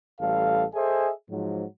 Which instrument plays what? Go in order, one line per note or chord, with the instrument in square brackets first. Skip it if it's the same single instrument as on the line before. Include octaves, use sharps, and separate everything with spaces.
[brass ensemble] A1 G3 A4 F5
G#4 A4 C5 D#5 E5 G#5
G#2 F3 F#3